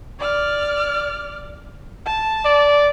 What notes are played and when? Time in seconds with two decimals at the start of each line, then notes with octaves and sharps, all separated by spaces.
0.20 D5 F6
2.06 A5
2.45 D5